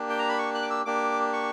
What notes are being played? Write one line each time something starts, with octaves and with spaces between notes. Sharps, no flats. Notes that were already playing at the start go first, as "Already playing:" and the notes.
Already playing: A#3 D4 G4
G5
A#5
B5
C#6
F#6
D6
E6
A#3 D4 G4 D6
C#6